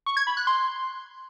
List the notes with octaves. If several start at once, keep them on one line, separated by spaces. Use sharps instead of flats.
C#6
G#6
B5
F#6
C6